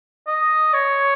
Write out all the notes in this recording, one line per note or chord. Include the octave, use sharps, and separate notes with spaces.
D#5
C#5